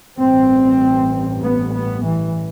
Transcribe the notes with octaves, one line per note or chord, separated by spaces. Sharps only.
A1 G2 C4
B3
B3
E3